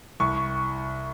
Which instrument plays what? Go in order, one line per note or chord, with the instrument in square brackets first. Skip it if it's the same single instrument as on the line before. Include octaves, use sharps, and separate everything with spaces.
[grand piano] C2 C#6